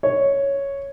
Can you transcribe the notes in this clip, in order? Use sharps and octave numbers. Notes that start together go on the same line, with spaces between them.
C#5